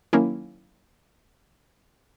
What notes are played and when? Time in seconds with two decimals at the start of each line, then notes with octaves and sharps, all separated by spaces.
0.13 D#3 F#3 A#3 C#4 E4